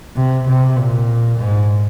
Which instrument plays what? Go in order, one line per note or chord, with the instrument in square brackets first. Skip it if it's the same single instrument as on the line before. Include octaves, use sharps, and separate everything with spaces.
[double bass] C3
C3
A#2
G#2